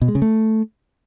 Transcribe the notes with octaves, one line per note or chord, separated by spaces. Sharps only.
B2
G#3
C#3
A3